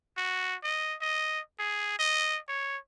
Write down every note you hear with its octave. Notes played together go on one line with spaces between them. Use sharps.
F#4
D#5
D#5
G#4
D#5
C#5